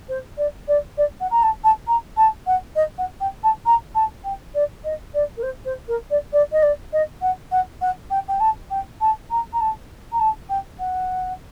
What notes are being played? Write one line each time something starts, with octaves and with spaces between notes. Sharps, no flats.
C5
D5
D5
D5
F#5
A#5
A5
A5
A#5
A5
F#5
D#5
F#5
G5
A5
A#5
A5
G5
D5
D#5
D5
A#4
C5
C5
A#4
D5
D5
D#5
D5
D#5
F#5
F#5
F#5
G5
G5
A5
G5
A5
A#5
A#5
A5
A#5
A5
G5
F#5